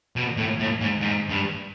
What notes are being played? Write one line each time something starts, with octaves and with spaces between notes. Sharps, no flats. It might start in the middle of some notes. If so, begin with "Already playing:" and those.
B2
A2
A2
G#2
G#2
G2